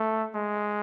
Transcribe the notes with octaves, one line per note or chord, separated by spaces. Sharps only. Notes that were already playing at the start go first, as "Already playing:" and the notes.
Already playing: A3
G#3